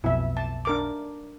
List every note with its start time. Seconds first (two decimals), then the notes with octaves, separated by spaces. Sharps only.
0.04 B1 F2 B2 E4 E5
0.37 A5
0.65 D4 A#4 D6